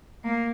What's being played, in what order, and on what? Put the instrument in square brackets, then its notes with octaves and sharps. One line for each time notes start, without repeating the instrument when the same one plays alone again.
[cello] A#3